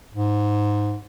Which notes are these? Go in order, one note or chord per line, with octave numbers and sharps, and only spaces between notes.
G#2